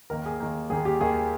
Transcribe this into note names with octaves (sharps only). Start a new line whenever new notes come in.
D#2 D#3 A#3 A#4
G#4
D#2 D#3 A#3
D#2 D#3 A#3 G#4
G4
D#2 D#3 A#3 G#4